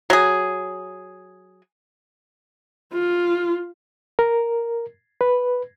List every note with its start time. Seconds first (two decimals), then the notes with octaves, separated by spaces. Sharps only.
0.10 F#3 G#4
2.94 F4
4.19 A#4
5.21 B4